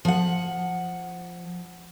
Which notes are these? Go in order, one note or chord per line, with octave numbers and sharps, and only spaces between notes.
F3 F#5